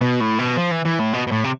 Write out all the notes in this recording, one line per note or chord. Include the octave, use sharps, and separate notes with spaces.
B2
A2
B2
F3
E3
E3
A2
B2
B2
A2
C3